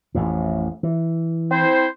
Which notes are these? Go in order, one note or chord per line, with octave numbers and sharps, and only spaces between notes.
A1 F2 A2
E3
C4 E4 C5